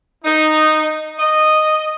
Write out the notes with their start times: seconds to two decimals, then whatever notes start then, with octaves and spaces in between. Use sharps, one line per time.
0.25 D#4
1.19 D#5